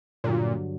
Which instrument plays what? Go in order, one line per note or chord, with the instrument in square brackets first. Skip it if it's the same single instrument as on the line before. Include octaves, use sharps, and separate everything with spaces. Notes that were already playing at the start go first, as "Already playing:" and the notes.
[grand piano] G2 D3 F#3 [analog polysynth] A#2